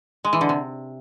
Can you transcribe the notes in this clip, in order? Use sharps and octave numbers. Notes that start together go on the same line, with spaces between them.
G#3
E3
D3
C3